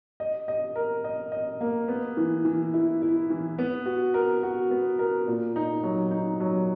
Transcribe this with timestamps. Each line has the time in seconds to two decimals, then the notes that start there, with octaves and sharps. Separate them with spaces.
0.20 D#5
0.48 D#5
0.76 A#4
1.04 D#5
1.32 D#5
1.61 A#3
1.88 B3
2.17 E3
2.45 E3
2.74 E4
3.02 E4
3.30 E3
3.58 B3
3.86 F#4
4.14 A#4
4.43 F#4
4.71 B3
4.99 A#4
5.27 A#2
5.56 D#4
5.83 F#3
6.11 D#4
6.40 F#3